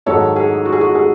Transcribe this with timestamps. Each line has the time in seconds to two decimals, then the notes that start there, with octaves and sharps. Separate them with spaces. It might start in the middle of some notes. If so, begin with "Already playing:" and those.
0.06 G#2 D#3 F#3 A4 C#5
0.36 G#4
0.65 F#4
0.72 G#4
0.81 F#4
0.95 G#4